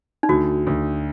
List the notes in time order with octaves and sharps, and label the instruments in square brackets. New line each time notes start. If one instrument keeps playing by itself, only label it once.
[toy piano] D#4
[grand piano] D2 [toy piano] F#4
[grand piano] D2